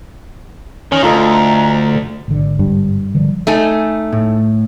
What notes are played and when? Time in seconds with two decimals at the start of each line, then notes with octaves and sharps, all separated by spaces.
0.92 D#3 C#4
1.03 D2 F4 A4 D#5 A#5
2.28 G#1 D3
2.59 G2
3.15 D3 F3 G3
3.47 A3 D#4 G#5
4.12 A2